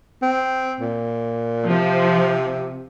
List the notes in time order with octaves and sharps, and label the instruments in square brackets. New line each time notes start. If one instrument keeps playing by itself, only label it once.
[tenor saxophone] C4
A#2
[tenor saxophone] C3 [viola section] F3